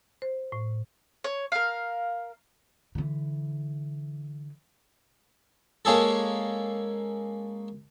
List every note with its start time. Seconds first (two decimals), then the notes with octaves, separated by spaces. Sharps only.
0.22 C5
0.52 A2
1.24 C#5
1.52 A#4 F5
2.95 D3 E3
5.85 G#3 A#3 C#4 G#4 A4